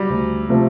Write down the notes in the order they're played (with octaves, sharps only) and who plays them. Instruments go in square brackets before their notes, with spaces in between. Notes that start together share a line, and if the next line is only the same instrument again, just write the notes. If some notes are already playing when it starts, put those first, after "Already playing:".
Already playing: [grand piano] F#3 G3
[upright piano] D2
C3 F3 A3 C4